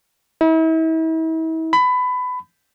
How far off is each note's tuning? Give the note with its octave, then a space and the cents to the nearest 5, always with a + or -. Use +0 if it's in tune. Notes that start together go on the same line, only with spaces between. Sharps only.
E4 -40
B5 +20